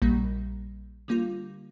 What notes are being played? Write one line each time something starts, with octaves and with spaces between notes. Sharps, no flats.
A#1 A#2 G3 A#3
D3 G3 A#3 F4